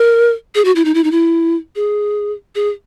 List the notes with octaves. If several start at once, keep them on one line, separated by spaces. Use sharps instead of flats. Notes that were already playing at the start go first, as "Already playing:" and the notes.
Already playing: A#4
G#4
F#4
E4
D#4
E4
D#4
E4
G#4
G#4